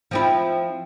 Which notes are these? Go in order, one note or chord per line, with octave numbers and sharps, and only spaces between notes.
F3 C4 E4